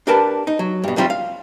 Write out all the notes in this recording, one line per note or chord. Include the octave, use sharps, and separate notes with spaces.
D4 G4 A#4 B4 A5
D#4
F#3
G2 B2
G2 C3 F#3 G3 C4 F4
F5